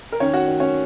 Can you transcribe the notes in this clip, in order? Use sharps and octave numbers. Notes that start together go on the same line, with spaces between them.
A#4
D#3 C#4 C#5
F#4 F#5
D#3
C#4 C#5